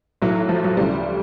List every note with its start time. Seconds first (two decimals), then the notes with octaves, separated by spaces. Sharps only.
0.22 B1 A2 E3 F#3
0.49 F3
0.64 F#3
0.77 D2 C#3 E3 G3